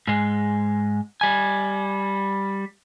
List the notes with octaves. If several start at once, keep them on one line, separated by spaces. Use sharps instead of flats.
G#2 G#3
G3 G#5